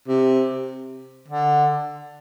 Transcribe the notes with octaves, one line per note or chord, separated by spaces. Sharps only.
C3
D3